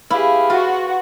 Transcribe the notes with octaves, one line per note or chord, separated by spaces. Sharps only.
E4 G4 G#4 B4 F5
F4 F#4